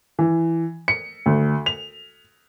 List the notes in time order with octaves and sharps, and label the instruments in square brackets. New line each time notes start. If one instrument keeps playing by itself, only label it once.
[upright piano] E3
C#7
D2
F7